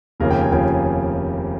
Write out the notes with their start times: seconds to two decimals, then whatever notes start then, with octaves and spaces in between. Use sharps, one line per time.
0.20 F1 D#2 C#3 F3 A#4
0.31 G5
0.41 G#5
0.52 F1 D#2 C#3 F3 G5